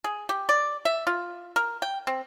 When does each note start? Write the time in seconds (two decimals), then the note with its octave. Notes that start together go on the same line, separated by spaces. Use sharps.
0.04 G#4
0.29 G4
0.49 D5
0.85 E5
1.07 F4
1.56 A#4
1.82 G5
2.07 C4